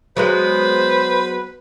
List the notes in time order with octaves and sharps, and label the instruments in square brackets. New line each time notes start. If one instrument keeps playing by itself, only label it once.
[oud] F#3 G#3 B3 [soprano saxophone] B4 [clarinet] C5